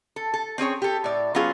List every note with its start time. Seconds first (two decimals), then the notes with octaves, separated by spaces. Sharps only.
0.16 A4
0.34 A4
0.58 C4 C#4 G#4 C#5
0.82 G4 A4
1.04 A2 D5
1.35 F#3 B3 C#4 F4 G#4